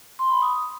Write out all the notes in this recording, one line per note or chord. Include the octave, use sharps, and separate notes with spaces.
C6
B5
D#6